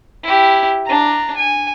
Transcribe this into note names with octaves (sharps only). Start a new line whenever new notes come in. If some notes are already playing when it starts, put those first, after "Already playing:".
E4 G4
D4 A#5
G#5